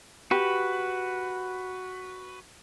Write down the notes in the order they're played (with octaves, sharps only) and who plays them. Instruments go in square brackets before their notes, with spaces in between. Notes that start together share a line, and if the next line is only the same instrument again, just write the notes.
[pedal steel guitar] F#4 B4 [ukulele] G4